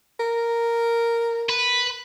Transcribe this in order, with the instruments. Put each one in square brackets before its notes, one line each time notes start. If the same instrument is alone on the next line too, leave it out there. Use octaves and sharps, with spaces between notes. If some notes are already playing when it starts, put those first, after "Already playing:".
[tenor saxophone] A#4
[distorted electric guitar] B4